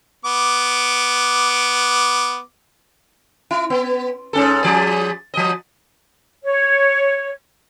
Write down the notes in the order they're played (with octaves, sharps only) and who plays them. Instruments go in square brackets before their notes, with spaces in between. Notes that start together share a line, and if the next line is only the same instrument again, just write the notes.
[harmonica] B3 D6
[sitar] E4
B3
G#2 C#4 A4
F3 G#4 D5
F3 D#5
[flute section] C#5